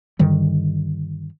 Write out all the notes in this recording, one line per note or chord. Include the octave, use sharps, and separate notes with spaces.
G2 D3 D#3 G3